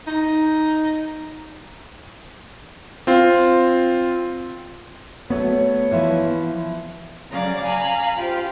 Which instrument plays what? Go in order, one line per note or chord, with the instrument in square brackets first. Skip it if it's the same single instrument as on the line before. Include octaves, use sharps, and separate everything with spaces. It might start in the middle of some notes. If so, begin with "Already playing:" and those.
[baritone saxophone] D#4
[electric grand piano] C4 F4
[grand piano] F#3 A3 [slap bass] B3 [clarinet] C#5
[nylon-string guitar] E3 F3 [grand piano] E4 E5
[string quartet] C#3 F#3 D5 F5 A#5
F5 G#5 A#5 B5
F4 G4 C5 F5